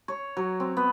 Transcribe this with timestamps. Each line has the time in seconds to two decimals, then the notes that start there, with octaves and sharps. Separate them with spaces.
0.08 C#5
0.37 F#3
0.60 C4
0.77 B3